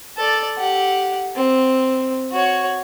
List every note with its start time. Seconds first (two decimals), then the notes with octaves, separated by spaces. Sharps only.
0.17 A4 D5
0.58 G4 F#5
1.36 C4
2.32 F#4 C#5